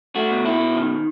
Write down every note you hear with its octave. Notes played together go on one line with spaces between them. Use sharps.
A3 F#4
B2
E4
B2
D#3